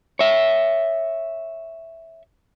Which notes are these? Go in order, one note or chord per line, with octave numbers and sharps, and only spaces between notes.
C#5 E5